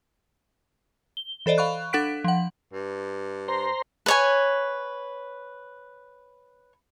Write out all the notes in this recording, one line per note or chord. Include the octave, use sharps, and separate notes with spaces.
G7
E3 A4 C5 D5 D#5
F5 B5 C#6 F#6
D4 A4 F#5 F#6 B6 D7
F3 F#5
G2
C5 A#5 C6
B4 C#5 G#5